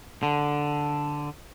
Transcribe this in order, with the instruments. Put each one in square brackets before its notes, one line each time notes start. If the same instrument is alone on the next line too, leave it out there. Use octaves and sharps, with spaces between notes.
[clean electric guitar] D3